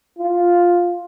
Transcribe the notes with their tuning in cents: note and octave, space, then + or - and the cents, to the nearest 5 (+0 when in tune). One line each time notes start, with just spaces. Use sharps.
F4 +5